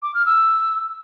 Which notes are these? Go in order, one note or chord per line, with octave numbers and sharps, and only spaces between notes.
D6
F6
E6